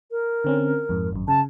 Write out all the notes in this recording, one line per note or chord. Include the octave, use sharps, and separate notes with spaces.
A#4
D3 C4 C#4
F2 G#2
G#1 F#2
C#3 A5